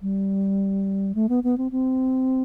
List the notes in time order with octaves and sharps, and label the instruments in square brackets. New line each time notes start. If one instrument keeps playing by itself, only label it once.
[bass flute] G3
A3
B3
B3
C4
C4